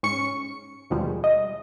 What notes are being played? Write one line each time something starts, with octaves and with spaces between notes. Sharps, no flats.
G#2 C#4 C#6 C#7
D#2 B2 D#3 F3 G3 G#3
D#5